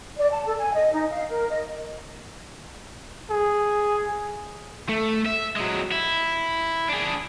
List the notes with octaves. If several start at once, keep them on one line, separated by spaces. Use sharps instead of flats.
D5
A5
A4
G#5
D#5
D#4
F5
A#4
D#5
G#4
A3
E5
F#3 G#3
E4
D4 G#4